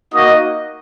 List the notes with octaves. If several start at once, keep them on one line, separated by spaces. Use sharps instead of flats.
A#3 D#4 F#4 D#5